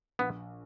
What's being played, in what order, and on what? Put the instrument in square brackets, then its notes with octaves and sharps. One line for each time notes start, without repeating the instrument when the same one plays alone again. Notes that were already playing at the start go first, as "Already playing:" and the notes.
[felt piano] A#1 [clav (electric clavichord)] B3